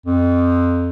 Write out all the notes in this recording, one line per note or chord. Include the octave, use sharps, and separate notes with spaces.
F2